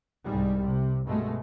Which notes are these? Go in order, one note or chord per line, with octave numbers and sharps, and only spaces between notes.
C2 G#2 G3
C3
G2 B2 G#3 A3